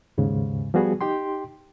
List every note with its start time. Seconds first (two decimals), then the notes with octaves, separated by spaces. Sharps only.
0.18 D#2 G#2 C#3
0.74 F3 G3 B3 F#4 G#4
1.01 D#4 G4 G5 C6